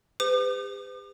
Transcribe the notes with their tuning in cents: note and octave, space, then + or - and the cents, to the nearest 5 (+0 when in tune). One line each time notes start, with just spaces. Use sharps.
G4 +45 B4 +45 D6 +45